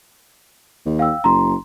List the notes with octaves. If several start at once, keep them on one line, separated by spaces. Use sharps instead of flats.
D#2
F5 G5 E6
F#1 A#5 C6